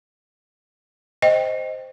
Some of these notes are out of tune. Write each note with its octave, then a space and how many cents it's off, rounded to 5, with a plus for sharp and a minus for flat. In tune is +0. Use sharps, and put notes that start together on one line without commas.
C5 +0 D#5 +0 G5 +0